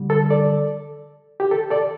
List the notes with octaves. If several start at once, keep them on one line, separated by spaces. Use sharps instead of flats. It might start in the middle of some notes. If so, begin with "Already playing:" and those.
Already playing: D3 G3
A4
A4 D5
G4
A4
A4 D5